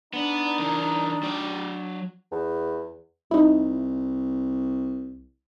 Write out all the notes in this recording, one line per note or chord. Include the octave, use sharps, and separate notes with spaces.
B3 D4 D#4
E3 A#4
F#3 D5
E2
C2 D#4 E4